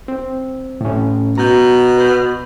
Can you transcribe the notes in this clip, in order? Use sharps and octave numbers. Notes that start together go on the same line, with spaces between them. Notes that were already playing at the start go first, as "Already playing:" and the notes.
C4
A2 C#4
B2 A#5 G6
B4 G6